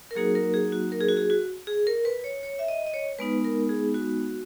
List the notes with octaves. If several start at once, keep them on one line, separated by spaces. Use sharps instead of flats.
A#4
F#3 A#3 D#4 F#4 G#4
A#4
G#4
F#4
A#4
G#4
F#4
G#4
F#4
G#4
A#4
B4
C#5
C#5
E5
D#5
D#5
C#5
G#3 B3 D#4 B4
A#4
G#4
F#4